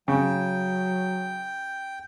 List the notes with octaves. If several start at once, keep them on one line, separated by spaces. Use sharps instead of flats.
C#3 F#3 G5